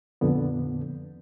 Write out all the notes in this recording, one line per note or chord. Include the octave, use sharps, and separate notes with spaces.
F2 A#2 D3 B3